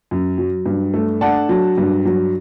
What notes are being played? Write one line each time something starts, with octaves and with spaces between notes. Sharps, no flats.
F#2
F#3
G2
A3
D4 F#5 A5
F#3
G2
F#3